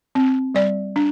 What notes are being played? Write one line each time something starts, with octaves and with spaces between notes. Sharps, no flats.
C4
G3 D5
D4